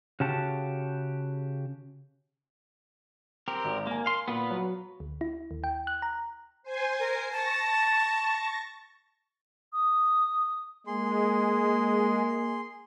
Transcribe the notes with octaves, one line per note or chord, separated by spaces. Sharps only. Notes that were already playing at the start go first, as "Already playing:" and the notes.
C#3 F#4 G4 A5
C4 G4 A#4
G#1
A#3 A#4 G#5
F5 C6
A#2 B3 F4 B4
F#3
D2
E4
D#2
G5
F#6
A#5
C5 G#5 C6
A#4
A5 C#6 A6 A#6
D#6
G#3 A#3 G#4 C6